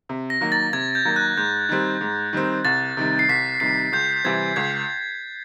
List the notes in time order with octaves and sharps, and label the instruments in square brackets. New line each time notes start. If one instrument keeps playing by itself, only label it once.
[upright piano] C3
[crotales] A#6
[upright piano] D#3 F#3 A#3
[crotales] A6
[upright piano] C3 [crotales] G#6
[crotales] G6
[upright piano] D#3 F#3 A#3
[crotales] F#6
[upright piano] G#2 [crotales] G6
[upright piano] D#3 G3 C4
G#2
D#3 G3 C4
[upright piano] C2 [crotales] A6
[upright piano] C3 D#3 G3
[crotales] C7
[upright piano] C2 [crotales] B6
[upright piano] C3 D#3 G3 [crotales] C7
[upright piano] C#2 [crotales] G6
[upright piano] C3 E3 G3 C4 [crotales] G#6
[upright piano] C#2 [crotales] G#6